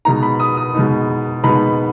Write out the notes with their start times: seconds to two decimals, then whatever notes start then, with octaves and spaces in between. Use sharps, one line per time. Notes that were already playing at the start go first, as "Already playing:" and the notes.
0.05 B2 G#3 B3 D#4 A#5
0.23 B5
0.40 D#6
0.57 D#6
0.74 B2 G#3 B3 D#4
1.43 B2 G#3 B3 D#4 B5